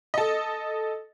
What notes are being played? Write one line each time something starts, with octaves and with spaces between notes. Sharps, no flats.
A4 D#5